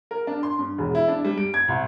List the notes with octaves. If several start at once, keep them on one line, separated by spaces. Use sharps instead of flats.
A#4
D4
C6
G2
E1
E4
D4
G3
D7
G#6
C2